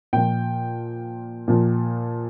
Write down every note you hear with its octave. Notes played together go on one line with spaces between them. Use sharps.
A#2 F3 G5
A#2 F3